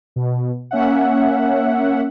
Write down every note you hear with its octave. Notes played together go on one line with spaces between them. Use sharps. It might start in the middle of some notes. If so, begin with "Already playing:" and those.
B2
A#3 C#4 E5 F#5